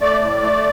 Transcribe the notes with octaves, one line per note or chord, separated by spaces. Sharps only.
A3 D5
A2
A3